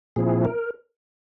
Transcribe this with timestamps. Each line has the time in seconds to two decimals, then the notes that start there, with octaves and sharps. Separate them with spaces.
0.16 A#2 F3 C4 E4 G#4
0.45 A#4